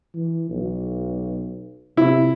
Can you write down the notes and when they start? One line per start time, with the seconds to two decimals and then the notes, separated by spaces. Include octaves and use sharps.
0.15 E3
0.50 B1
1.97 C3 E4